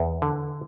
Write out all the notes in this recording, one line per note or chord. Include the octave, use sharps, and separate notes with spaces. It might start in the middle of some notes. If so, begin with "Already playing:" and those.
Already playing: E2
D3